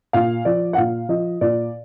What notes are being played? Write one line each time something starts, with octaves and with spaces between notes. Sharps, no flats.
A#2 F5
F3 D5
F#5
A#2 F5
F3 D#5
A#2 D5